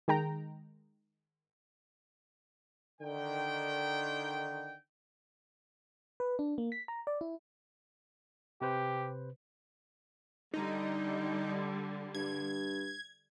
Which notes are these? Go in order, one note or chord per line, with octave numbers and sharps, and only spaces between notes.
D#3 G#3 G5 A#5
D3 D#3 G5
B4
D4
A#3
B6
A#5
D5
E4
C3 G4 B4 C5
D3 G3 D#4
G2 G#6